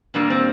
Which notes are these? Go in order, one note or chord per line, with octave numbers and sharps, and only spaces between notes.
A#2 G3 A#3 D4
C4